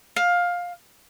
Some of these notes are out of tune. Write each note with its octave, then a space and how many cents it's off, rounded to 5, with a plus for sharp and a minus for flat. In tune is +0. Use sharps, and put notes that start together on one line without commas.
F5 +15